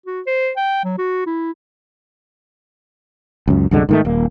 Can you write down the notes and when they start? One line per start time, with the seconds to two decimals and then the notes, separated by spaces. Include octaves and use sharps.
0.06 F#4
0.27 C5
0.57 G5
0.84 F#3
0.98 F#4
1.26 E4
3.48 C#2 F#2
3.71 C2 F#2 D3 G#3
3.89 G#2 D#3 A3
4.05 D#1 A#3